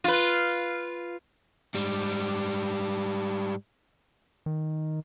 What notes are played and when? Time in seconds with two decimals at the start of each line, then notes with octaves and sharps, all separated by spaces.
0.04 F4 B4
1.74 G#2 G3
4.46 D#3